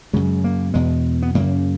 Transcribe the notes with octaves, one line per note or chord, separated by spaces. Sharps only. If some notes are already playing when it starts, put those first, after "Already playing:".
F#2 C#3 G#3
A#3
E2 B2 G#3
B3
F#2 C#3 A#3